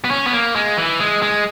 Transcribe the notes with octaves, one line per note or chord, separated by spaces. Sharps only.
B3
C#4
B3
A#3
G#3
E3
G#3
G#3